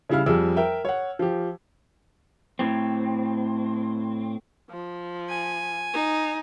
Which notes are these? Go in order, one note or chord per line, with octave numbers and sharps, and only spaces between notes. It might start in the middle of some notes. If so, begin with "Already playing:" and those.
C#3 G3 E4 F5 F6
F2 G3 G#4 E6
A#4 E5 G5
C#5 F#5
F3 G4
A2 C4
F3
G#5
D#4